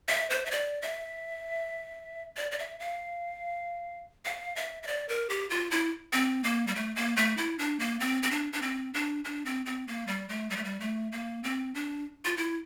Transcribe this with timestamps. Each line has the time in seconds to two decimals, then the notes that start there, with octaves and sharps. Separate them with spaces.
0.09 E5
0.30 C5
0.46 E5
0.51 D5
0.82 E5
2.37 D5
2.51 D5
2.59 E5
2.80 F5
4.25 F5
4.56 E5
4.83 E5
4.87 D5
5.09 A#4
5.30 G4
5.50 F4
5.71 E4
6.13 C4
6.44 A#3
6.67 G3
6.75 A3
6.96 A#3
7.17 A3
7.37 E4
7.59 D4
7.79 A#3
8.00 C4
8.23 C4
8.31 D4
8.53 D4
8.62 C4
8.94 D4
9.25 D4
9.46 C4
9.66 C4
9.88 A#3
10.07 G3
10.29 A3
10.50 G3
10.57 A3
10.64 G3
10.80 A3
11.12 A#3
11.44 C4
11.75 D4
12.25 F4
12.37 E4